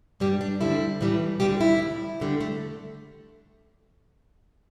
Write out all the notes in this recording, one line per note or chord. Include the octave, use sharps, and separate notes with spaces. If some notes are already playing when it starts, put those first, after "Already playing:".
G2 G3 G4
D4
D2 D3 G3 E4
A2 E3 G3
D2 D3 G3 G4
E4
A2 G3
E2 D3 G3
A3